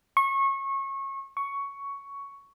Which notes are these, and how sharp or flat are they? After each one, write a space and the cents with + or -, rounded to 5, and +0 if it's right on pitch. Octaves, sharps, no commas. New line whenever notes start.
C#6 -25
C#6 +10